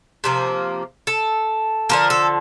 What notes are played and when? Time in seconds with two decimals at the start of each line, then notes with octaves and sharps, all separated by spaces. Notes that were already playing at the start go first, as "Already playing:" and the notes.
0.24 C3 F3 A#3
1.07 A4
1.89 D3 F3 A#3 A#4
2.10 A4